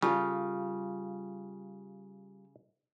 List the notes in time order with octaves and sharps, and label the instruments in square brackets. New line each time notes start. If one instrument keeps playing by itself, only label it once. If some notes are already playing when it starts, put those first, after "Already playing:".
[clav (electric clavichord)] C#3 [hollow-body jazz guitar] G3 F4 A4